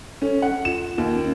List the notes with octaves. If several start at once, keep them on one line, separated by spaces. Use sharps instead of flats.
C#4 A4
F#5
F4 E7
D#2
C#4